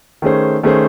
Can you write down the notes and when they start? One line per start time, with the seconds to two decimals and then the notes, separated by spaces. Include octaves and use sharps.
0.22 D#3 A3 C#4 G#4 C5
0.63 D#3 A3 C#4 G#4 C5